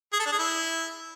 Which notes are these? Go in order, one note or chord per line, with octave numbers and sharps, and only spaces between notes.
G#4
A4
D4
G#4
E4